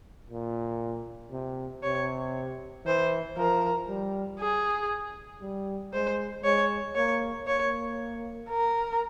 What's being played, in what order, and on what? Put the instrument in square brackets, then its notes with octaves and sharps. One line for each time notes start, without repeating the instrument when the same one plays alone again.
[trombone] A#2
C3
[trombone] C3 [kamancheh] C#5
[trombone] E3 [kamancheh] C5
[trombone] F3 [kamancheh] A#4
[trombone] G3
[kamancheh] G#4
[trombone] G3
[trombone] G#3 [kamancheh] C5
[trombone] G#3 [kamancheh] C#5
[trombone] A#3 [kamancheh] C#5
[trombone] A#3 [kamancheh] C#5
[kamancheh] A#4